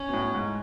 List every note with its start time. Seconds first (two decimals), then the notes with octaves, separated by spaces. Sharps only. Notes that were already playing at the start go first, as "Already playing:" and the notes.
Already playing: C#4
0.09 B2
0.13 A2
0.35 G#2